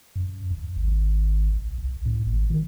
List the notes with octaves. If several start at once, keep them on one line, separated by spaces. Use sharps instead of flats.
F#2
D#2
G#1
B1
C2
A2
G#1
D#3